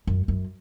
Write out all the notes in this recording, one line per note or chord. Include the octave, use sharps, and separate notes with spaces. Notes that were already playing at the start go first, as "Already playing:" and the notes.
F#2
F#2